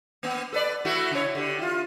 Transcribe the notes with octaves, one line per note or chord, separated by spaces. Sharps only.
A#3 B3
A4 B4 D5
A3 E4 F#4
C#3 C#5
D3 G4
E4 F4